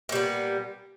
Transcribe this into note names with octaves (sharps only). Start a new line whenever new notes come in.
A#2 G3 B3